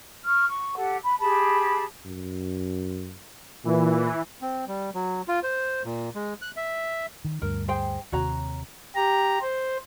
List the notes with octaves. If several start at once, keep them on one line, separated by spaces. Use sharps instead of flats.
C#6 F6
C#6
G4 A4 F#5
B5
G4 G#4 A5 B5
F#2
A#2 E3
C4
G3
F#3
F4
C5
A#2
G#3
F#6
E5
D#3
D2 G2 A#4
G#4 C5 G5
D#2 C3 F#4 C#5 A#5
G4 A#5
C5